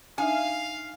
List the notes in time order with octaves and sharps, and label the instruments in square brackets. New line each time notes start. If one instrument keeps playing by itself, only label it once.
[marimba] D4 D#4 E5 [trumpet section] F5 [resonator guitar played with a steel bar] G#5